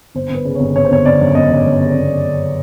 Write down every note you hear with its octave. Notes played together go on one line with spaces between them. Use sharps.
G1 C5
G1
B4
C#3
G1 C#5
G1 C#5
C5
G1 C#5
G1 D5
F#2
G1 D#5
F#2
F#2
C#3
G1
G1
C#3